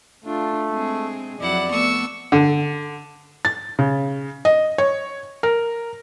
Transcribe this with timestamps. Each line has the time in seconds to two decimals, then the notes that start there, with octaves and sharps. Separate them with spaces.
0.24 A3 D4 F4
0.71 G#3 C4 G#4
1.41 F2 F#3 E4 D5 F#5
1.70 A3 B3 C#6 E6
2.32 D3
3.45 A6
3.79 C#3
4.45 D#5
4.78 C#5
5.43 A#4